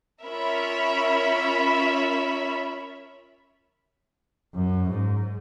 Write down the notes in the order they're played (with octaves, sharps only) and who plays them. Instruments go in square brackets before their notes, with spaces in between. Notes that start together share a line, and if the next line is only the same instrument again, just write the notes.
[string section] C#4 F4 A#4 C#5 E5 B5
[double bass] F#2
G#2